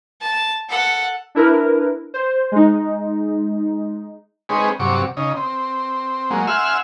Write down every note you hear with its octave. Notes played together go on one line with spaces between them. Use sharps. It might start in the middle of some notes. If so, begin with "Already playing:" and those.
A5
A4 F#5
D4 E4 A#4 B4
C5
G#3 D#4
G#3 C4 D#4 G#4 B4 C#5
G2 C3 F#3 C#6 D6
C#3 D#4
C4
F#3 G#3 A#3
E5 F#5 G#5 C6 E6 F6